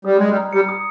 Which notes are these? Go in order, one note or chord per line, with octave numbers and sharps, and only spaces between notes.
G3 D#6
G#3 G#6
G3
A#5
G3 C#7
D#6